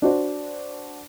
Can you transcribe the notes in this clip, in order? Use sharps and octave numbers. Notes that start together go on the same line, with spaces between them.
D4 F#4 C5